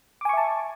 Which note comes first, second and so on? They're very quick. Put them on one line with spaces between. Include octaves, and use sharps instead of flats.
D6 G#5 C#6 E5 A5